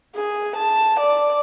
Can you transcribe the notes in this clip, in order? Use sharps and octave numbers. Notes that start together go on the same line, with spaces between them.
G#4
A5
D5